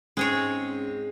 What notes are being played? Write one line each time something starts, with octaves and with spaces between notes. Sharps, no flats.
G#2 G#3 C4 C#4 G#4 C#5